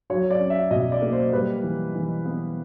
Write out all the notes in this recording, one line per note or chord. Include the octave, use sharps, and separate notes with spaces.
F#3 C#5
D5
C#4
E5
B2 D#5
D5
A#3
C5
G3 B4
E3
E3
B3